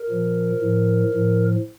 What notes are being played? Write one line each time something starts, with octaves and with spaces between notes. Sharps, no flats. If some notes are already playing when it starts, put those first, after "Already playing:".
Already playing: A#4
A#2 F3
A2 F3
A2 F3